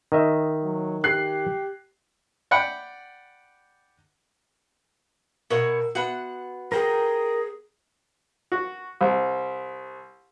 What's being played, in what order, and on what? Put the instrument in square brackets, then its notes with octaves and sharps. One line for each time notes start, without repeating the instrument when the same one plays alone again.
[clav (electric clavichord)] D#3 D#5 E5
[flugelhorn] F#3
[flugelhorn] G4 [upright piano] F#6 C7
[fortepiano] D5 F#5 G5 B5
[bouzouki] B2 C#5 F#5 [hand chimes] A#4
[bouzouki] B3 F#5 [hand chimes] F#4
[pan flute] G#4 [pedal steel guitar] A#4 G5
[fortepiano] F#4
C2